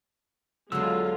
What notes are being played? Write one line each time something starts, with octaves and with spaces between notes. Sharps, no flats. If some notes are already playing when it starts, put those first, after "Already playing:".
E2 D3 F#3 G#3 F4 E6